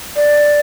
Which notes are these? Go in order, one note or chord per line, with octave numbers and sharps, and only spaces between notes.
D5